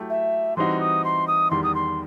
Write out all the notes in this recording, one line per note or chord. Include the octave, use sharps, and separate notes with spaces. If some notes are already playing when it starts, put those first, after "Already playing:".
Already playing: F#3 A3 E4 G4
E5
E3 G3 C4 D#4 F#4 C6
D#6
C6
D#6
E2 D#3 G3 C6
D#6
C6